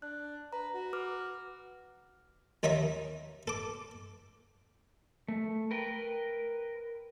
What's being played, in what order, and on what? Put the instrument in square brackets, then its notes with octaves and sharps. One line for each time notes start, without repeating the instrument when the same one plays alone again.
[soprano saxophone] D4 [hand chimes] F#6
[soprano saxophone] B4 [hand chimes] A#5
[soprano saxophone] F#4
[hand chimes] B4 D6 F6
[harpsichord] D#2 D#3 D#4 C#5 E5 A#5
A4 D6
[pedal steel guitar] A3
A#4 B4 G5